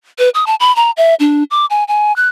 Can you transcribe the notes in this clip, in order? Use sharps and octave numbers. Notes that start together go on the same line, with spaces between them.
B4
D#6
A5
B5
A#5
E5
D4
D6
G#5
G#5
F#6